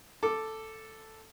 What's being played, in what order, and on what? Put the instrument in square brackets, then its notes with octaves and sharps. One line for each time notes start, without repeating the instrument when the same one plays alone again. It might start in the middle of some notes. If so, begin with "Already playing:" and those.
[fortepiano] A4 D6